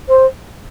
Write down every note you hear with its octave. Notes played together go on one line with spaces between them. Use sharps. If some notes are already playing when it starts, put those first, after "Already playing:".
C5